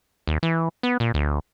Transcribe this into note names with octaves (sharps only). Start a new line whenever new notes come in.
D#2
E3
B3
A#2
D2